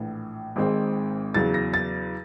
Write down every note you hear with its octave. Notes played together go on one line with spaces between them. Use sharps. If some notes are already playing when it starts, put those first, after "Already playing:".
Already playing: A#1 A2 E3
G#1 G#2 D#3 G#3 C4
E2 C#3 F#3 A6
A#6
A6